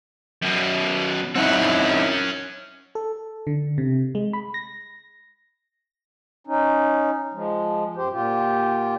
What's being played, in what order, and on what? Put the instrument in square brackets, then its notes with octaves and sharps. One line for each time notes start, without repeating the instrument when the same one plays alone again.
[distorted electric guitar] F#2 B2
[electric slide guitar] C4 D#4 E4 [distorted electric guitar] C#4 F#5
[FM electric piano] A4
D3
C3
G#3
B5
A#6
[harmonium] C#4 D#4
F3 G#3
F#2 G4 C5
A#2 F4 G4